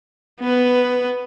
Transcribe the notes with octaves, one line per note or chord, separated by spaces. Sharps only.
B3 B4